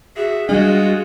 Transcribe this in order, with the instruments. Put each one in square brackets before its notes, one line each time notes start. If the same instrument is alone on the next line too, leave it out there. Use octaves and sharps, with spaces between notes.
[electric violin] F#4 E5 [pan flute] G#4
[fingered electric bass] G3 D4 [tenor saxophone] G#3 [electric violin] F4 F#4